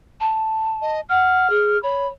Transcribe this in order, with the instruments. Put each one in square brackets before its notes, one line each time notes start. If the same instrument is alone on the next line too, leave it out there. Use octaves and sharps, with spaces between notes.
[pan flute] A5
[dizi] D#5
[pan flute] F#5 [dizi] F6
[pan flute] G#4
[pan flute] C#5 [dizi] B5